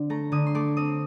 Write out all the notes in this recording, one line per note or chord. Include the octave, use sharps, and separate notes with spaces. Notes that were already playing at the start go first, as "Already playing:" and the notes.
Already playing: D3 C4
A3 A#5
D3 D#6
C6
A3 D6
C4 D#6